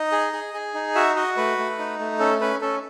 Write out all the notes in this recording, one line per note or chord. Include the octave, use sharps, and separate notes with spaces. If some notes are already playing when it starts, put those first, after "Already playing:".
Already playing: D#4 D#5
G#4
G#4
G#4
D#4
F#4 E5
F#4 D#5
A3 B4
A3
D#4
A3
C#4 A4
C#4 B4
C#4 A4